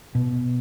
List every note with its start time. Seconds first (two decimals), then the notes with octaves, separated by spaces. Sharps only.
0.15 B2